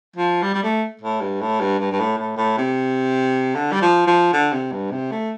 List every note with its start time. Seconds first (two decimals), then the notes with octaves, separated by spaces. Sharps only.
0.16 F3
0.42 G3
0.54 G3
0.63 A3
1.01 A2
1.21 G2
1.41 A2
1.60 G2
1.79 G2
1.92 G2
2.00 A2
2.18 A2
2.38 A2
2.58 C3
3.55 D3
3.72 G3
3.82 F3
4.07 F3
4.33 D3
4.52 C3
4.72 G2
4.92 C3
5.11 A3